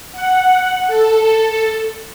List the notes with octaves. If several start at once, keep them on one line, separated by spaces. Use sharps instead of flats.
F#5
A4